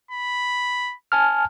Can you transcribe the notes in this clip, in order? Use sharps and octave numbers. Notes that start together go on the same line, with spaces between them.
B5
G#5 A5 F6